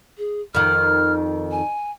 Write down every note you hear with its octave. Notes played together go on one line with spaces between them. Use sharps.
G#4
F2 D#3 F6
G#5